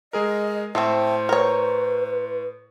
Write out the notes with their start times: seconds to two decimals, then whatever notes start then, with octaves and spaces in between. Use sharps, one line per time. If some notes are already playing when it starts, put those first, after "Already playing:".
0.13 G#3 G#4 A#4 D#5
0.75 A2 A3 C4 C5 C6
1.29 A#4 B4 C#5